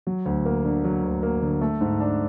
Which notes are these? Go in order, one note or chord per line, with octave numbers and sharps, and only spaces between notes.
F#3
D2
A#3
D3
F#3
D2
A#3
D3
A3
G#2
D4